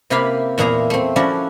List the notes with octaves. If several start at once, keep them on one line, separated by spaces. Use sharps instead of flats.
C3 A#3 E4 G4 F5 B5
E2 A#2 E4 G#4 A#5
A3 C4
F3 C#4 D4 E4 F#4